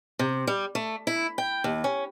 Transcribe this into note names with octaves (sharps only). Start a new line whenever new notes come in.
C3
G3
A3
E4
G5
D#2
C#4